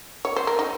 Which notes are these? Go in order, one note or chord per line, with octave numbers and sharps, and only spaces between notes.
C#5
C5
A#4
D#4